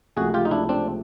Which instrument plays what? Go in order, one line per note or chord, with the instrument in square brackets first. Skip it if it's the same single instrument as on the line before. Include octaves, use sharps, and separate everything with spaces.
[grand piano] C#2 C3 F3 A3 [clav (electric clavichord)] F#4 G#4
[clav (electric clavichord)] F4 G4
D#4
D4 E4
C4 D4